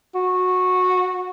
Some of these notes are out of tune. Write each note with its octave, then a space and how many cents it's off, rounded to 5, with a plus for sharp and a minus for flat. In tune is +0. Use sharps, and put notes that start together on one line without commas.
F#4 -15